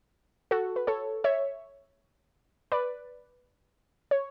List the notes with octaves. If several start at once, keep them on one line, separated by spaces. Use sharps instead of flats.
F#4 A4
B4
A4 C#5
C#5 E5
B4 D5
C#5